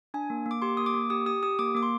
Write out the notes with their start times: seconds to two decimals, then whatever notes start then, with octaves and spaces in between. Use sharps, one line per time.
0.14 D4 G#5
0.30 A#3
0.46 A#3
0.51 D6
0.62 G4 C6
0.77 A#3 D#6
0.86 D6
0.94 A#3
1.10 G4 D#6
1.26 G4 D#6
1.43 G4 D#6
1.59 A#3 D6
1.75 A#3 D6
1.83 C6